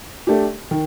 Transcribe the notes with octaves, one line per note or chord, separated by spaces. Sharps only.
A3 D4 G4
D#3